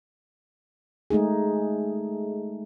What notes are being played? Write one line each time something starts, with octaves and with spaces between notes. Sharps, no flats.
G#3 A3 D#4 G#4